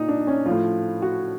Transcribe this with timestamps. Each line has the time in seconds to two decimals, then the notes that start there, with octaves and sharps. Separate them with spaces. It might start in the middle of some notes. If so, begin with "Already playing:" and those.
Already playing: A#2 D#4
0.08 D4
0.27 C#4
0.46 A2 F3 F4
1.02 F#4